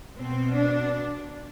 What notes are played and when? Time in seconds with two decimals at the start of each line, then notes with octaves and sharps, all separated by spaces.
0.18 B2 C4
0.56 D4